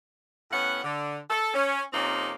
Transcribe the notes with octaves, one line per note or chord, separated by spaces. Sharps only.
A2 B3 C#4 F#5
D3
A4
C#4
F2 C3 A#3 C4 C#4 D#4